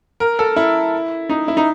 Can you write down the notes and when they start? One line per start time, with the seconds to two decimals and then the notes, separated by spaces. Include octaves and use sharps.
0.20 A#4
0.39 A4
0.56 E4
1.29 D#4
1.48 E4
1.57 D#4